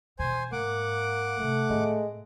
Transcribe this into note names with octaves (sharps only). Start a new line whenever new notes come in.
E2 B2 C5 G#5
G#2 A#3 F#5 D6
F#2 C3 A3
A2 G#3 C4